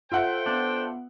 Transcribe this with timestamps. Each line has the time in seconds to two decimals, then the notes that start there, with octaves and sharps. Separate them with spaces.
0.12 F4 A4 C5 E5 F#5 G5
0.46 B3 D4